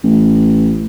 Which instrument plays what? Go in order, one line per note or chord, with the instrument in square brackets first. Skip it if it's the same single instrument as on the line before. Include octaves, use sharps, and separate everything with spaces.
[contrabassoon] A1